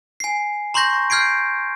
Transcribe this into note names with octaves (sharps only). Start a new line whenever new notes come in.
G#5 C7
A#5 C6 C#6 G6 A#6
F6 G6 G#6 C7 D7